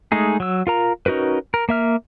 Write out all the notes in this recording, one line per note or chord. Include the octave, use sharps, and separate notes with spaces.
G#3 A3 D#4 G#4
F#3 E6
F4 A#4 A#5
C#4 D#4 F#4 A#4 B4
A#4
A#3 E5 F6